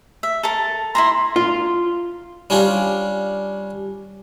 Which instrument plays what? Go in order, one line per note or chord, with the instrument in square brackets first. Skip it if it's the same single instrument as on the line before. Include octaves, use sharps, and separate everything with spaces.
[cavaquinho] E5
A4 A#4 A5
[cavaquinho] E4 G#4 A#5 [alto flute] C6
[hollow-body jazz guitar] F4
[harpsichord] G3 C#4 D4 F4